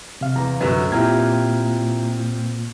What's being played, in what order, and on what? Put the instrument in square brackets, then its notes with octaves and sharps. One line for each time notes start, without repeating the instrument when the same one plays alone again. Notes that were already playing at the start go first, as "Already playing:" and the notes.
[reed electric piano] C3 F5
[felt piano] E2 A#5
[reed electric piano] C2 B4 [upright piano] F#2 D3 [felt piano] C#4 F#4
[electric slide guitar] A#2 [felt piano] C4 [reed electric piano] E4 A#5 G#6 [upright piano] F4 G4